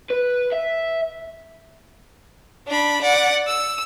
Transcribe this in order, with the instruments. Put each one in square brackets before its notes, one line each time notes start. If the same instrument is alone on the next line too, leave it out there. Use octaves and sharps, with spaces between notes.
[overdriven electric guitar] B4
E5
[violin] D4 B5
D5 F#5
E6